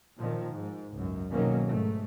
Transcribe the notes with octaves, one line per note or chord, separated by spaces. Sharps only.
A#2 D#3 F3
G#2
C#2 F#2
F#1 B1 D#3 F#3 A#3 C#4
G#2 A3